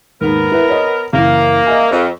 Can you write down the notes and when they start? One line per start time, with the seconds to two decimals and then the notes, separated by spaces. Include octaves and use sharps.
0.21 D#2 G#2 B3 A#4
0.52 E4 B4
0.70 C#5 D#5
1.13 F#1 E3 A#3
1.66 D#5 E5 G#5
1.91 F2 C5